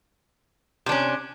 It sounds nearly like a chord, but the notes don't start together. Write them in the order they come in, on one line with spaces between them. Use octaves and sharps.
C3 D4 C#4